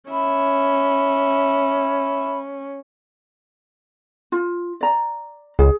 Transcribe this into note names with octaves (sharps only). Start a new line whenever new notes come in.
C#4 E5 B5
F4
D5 A#5
C#2 G#4